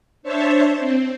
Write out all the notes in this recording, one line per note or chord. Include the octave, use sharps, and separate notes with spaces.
D4 C5 C#5 E5 A5
C4